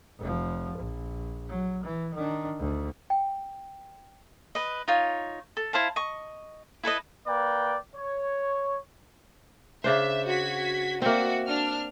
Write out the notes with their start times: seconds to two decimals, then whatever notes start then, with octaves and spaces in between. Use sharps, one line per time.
0.19 F1 F3
0.79 A#1
1.49 F#3
1.84 E3
2.15 D#3 D4
2.59 D2
3.10 G5
4.55 B4 D#5
4.88 D#4 F4 C#5
5.57 A4
5.73 E4 C5 F5 A5
5.96 D#5 C#6
6.83 E4 A4 B4 D#5
7.26 A#3 B4 D5 G5
7.95 C#5
9.84 C#3 D4 C5 E5
10.27 F#4 G#6 B6
11.02 A#3 C4 F#4 D5 E5
11.47 D4 F6